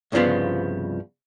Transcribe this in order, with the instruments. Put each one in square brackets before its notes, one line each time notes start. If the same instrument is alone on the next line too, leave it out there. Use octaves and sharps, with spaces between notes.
[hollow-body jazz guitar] C2 G2 C#3 F3 B3 F4